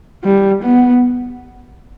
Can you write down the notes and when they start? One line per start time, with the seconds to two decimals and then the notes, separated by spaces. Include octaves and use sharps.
0.24 G3
0.63 B3